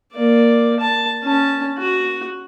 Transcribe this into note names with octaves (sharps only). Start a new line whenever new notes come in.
A#3 D5
A5
C#4 A5
F#4